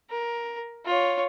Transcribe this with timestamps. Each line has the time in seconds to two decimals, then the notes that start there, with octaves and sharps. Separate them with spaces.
0.10 A#4
0.86 F4 C#5